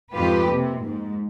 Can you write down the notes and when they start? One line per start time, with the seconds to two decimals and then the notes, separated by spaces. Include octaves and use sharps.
0.13 F2 G#2 F4 G4 B4
0.47 C3 A#3
0.84 G#2